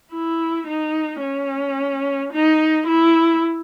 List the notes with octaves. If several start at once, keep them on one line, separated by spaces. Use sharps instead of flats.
E4
D#4
C#4
D#4
E4